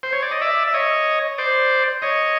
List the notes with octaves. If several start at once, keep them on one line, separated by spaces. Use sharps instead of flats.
C5
C#5
D5
D#5
D5 E5
E5
C#5 D#5
C5 D5
C#5 D#5